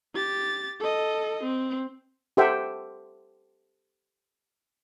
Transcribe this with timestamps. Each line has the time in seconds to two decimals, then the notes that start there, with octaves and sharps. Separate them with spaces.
0.14 G4 A6
0.80 A4 D#5
1.43 C4
2.37 G4 A4 C5 E5 F#5 G5